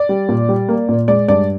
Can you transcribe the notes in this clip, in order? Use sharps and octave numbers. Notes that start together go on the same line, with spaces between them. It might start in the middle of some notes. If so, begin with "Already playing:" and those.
Already playing: D5
G3
A#2
G3
A#3
A#2
G#3 D5
G2 D5